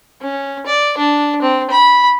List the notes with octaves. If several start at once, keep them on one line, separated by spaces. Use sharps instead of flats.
C#4
D5
D4
C4
B5